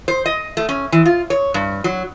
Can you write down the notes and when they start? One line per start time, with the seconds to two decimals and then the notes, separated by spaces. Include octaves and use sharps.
0.08 C5
0.26 D#5
0.57 A3
0.69 C#4
0.92 E3
1.05 F4
1.30 C#5
1.54 G2
1.84 F#3